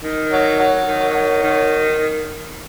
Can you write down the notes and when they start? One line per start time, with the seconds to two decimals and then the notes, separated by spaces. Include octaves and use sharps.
0.04 D#3
0.32 F#3
0.59 F#3
0.87 D#3
1.15 F#3
1.42 D#3